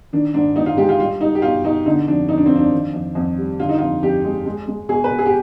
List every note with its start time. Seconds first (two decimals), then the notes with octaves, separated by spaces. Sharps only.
0.13 D#3 D4
0.34 G#2 D4
0.56 G#2 D#4
0.66 F4
0.77 G#3 G4
0.89 F4
0.99 G3 F4
1.21 G3 D#4
1.35 G4
1.42 B2 F4
1.64 B2 D#4
1.86 D3 D#4
2.08 F2 D4
2.29 F2 D#4
2.38 D4
2.46 C4
2.51 F3 D4
2.72 D#3
2.94 F2
3.15 F2
3.38 G3
3.59 D3 F4
3.69 D#4
3.78 F4
3.81 F2
4.02 F2 G4
4.24 G#3
4.46 G#3
4.68 G#3
4.89 B2 G#4
5.04 B4
5.11 B2
5.19 G#4
5.26 G4